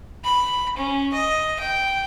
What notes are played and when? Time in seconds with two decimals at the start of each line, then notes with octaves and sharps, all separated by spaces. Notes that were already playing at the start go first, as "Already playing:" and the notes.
0.24 B5
0.76 C#4
1.13 D#5
1.59 G5